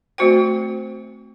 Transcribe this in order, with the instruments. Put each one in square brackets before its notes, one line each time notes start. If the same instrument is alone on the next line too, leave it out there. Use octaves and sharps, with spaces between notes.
[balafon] A3 C4 F#4 C5 G5